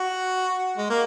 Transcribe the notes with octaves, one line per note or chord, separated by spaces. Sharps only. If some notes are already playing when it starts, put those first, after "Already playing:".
Already playing: F#4
G#3
A#3